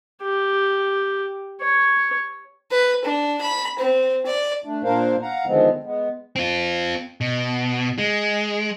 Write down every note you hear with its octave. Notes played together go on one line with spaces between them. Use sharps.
G4
C#5
B4
D4
B5
C4
D5
A3 D4
A#2 A#3 D4 A#4 C5 F5
F5 F#5 A#5
D3 D#3 F3 G#3 B3 C4
G#3 B3
C4 F4
B2
G#3